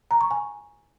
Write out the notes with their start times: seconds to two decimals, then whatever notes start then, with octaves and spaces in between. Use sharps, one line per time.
0.11 A#5
0.21 C#6
0.31 G#5